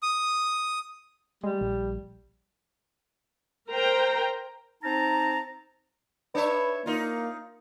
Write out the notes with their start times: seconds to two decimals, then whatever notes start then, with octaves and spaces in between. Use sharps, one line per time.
0.03 D#6
1.43 G3 G#3
1.61 A#1
3.72 A#4 C5 G5 A#5
4.83 C4 D#4 A5 A#5
6.35 D4 B4 C#5 E5
6.86 A#3 D#4 F4